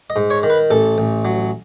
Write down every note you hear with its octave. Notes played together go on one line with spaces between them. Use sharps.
D#5
G#2
C#5
D#3
B4
A1 A4
A1
F#3